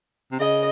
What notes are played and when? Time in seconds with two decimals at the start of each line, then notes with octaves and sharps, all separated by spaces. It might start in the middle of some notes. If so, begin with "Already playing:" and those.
0.32 C3
0.39 C#3 D#5